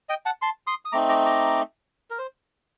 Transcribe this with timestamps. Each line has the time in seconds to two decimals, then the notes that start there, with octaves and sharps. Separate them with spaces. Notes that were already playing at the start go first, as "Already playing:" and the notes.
0.09 D#5 G5
0.26 F#5 A5
0.42 A5 C6
0.67 C6 D#6
0.85 D#6
0.92 A3 C4 D#4 A#5 D6
1.09 A#5 D6
1.26 A#5 D6
2.10 A#4
2.19 C5